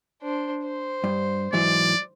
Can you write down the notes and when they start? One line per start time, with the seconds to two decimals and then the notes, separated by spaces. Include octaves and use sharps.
0.22 D4 C5
0.64 C5
1.04 G2
1.53 G#2 E3 F#3 D5